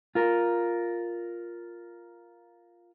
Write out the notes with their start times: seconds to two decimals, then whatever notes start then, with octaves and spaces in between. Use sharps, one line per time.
0.15 F4 A#4